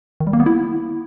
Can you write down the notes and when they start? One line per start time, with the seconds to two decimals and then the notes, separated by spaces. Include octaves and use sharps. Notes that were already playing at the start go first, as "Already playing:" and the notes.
0.20 D#3
0.27 G3
0.33 A#3
0.40 B3
0.46 E4